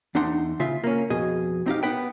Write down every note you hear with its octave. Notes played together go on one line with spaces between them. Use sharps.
E2 D4 D#4 F#5 C6
C#3 F4 E5
A#3 C#4
F2 B2 G#4 D#5
C4 D#4 G4 F5
B3 B4 G5